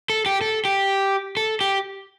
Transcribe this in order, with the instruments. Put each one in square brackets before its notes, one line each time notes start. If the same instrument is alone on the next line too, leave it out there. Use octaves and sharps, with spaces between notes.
[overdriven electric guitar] A4
G4
A4
G4
A4
G4